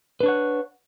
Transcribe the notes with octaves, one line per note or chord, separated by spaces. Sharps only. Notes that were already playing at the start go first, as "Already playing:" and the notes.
D4 B4 C#5 F#5